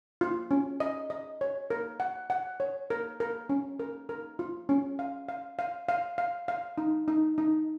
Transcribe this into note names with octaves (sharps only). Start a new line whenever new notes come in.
F4
C#4
D#5
D#5
C#5
A#4
F#5
F#5
C#5
A#4
A#4
C#4
A#4
A#4
F4
C#4
F5
F5
F5
F5
F5
F5
D#4
D#4
D#4